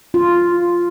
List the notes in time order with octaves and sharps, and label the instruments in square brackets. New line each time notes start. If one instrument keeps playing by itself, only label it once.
[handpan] F4